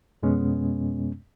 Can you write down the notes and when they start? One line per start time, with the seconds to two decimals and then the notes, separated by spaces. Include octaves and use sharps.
0.23 F2 B2 G#3 B3 C#4